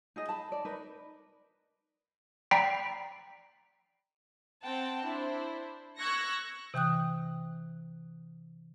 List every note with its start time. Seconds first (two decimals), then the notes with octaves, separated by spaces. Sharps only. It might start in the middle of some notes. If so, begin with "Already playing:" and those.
0.16 D#4 G#4 D#5
0.29 A5 B5
0.52 D5
0.65 D#4 A#4 B4
2.51 D5 G5 A#5 B5 B6 C7
4.62 C4 F#5 G5 A5
5.04 D4 E4 C5
5.98 C#6 E6 F#6 G#6 A#6 C#7
6.74 C3 E3 G5 D#6 F#6